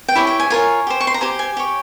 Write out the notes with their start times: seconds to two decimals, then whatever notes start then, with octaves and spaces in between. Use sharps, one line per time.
0.08 G5
0.15 E4 G4 C#5 G#5
0.27 G5
0.40 G#5
0.50 F4 A#4 C#5 G#5
0.87 G4 C5
1.01 C#6
1.07 C6
1.14 A#5
1.21 G4 C5 G#5
1.39 G#5
1.57 G4 C#5